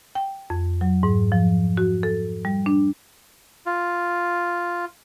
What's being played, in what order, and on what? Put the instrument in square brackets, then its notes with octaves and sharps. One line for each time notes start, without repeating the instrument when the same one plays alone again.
[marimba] G5
F2
F#3
G#2
F3
F#4
A4
G3
D4
[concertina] F4